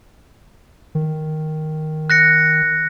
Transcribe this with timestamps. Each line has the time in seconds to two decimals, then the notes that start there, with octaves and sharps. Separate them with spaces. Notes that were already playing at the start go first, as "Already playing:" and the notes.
0.95 D#3
2.10 F#6 A#6 C#7